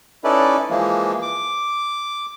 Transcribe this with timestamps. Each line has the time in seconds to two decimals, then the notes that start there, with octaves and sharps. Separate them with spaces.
0.24 C#4 D#4 E4 A4 B4 D5
0.70 E3 F3 G#3 A#3
1.22 D6